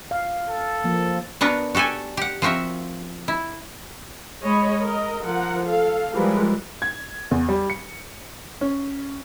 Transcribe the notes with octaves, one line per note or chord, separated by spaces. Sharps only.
F5
A4
F3 A#3
B3 D4 F#4 A#4 B4
F#4 G4 A4 D5 G#5
G4 F#5
F3 C4 F#4 A#4 E5
E4
G#3 C#5 D#5 B5
A#4 D#5
F3 A#4 F#5
A4 F5
E3 F3 G3 G#3 A#4 B4
G#6
E2
G3
C#7
C#4